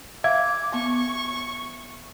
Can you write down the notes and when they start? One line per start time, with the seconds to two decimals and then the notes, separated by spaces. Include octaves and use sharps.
0.24 E5 F5 D6 G#6
0.74 B3 C#6